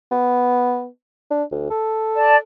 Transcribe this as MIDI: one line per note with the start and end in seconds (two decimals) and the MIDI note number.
0.11 0.87 59
1.31 1.43 62
1.51 1.68 38
1.70 2.42 69
2.15 2.36 74
2.15 2.36 81